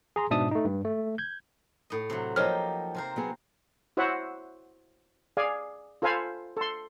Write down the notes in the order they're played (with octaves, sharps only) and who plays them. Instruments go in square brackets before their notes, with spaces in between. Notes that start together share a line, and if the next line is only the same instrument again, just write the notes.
[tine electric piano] G#4 A#5 C6
G#2 B2 D4 E5 A5 D#6
A3 D#4
G2
A3
G6 G#6
[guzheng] A2 D#5
C3 F#3
[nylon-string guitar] F3 F#3 D#5 [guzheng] A#3 D#4 G4 [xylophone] C#5 F6
[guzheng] C3 A#4 C5
[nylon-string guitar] F#3 B3 G#4
[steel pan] E4 F#4 C5 C#5 E5 F#5
G#4 D5 F5 G#5
F4 A4 C5 F5 G#5 B5
A4 C6